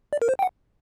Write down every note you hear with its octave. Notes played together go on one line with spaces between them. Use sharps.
D5
A#4
C5
G5
F#5